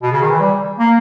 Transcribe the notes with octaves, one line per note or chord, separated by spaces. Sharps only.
B2
C#3
D#3
E3
G3
A#3